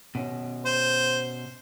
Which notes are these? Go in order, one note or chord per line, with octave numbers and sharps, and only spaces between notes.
B2 C#4
C5